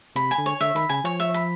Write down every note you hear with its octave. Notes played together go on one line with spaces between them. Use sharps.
C3 B5
G#5
D3
C#5
D3 E5
D#3 B5
C#3 G#5
F3 C#5
E5
B5